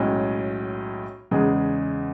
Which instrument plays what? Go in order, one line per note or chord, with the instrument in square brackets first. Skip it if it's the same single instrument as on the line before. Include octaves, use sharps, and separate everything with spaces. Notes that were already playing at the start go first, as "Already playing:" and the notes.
Already playing: [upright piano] B1 A2 G#3 C#4
E2 C#3 G#3 D#4 G#4